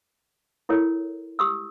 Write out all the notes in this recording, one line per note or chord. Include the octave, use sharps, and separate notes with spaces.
E4 A4 A#4 C#5
G4 D#6 E6